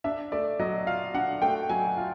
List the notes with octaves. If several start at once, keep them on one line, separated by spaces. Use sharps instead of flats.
D4 E5
A3 D5
F#3 D#5
F4 F5
D4 F#5
A3 G5
F#3 G#5
F4